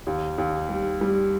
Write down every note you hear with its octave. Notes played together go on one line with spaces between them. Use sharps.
D#2
D#2
G3
G3